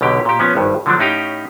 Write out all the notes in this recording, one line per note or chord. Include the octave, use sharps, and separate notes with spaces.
B1 B2 D3 G4
A#2 G4
F3 B3 C#4
G#1 G2
D3 F3 F#3 A3 D4
A2 C#4 D#4 G4 F5 G5